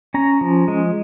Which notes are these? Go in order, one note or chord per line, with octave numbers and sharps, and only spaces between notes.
C#4 A#5
F3
G#3